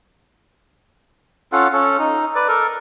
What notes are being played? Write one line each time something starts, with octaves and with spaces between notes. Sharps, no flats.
C#4 F4 A4 F#5
C#4 A4
D#4
B4 D5
A4 A#4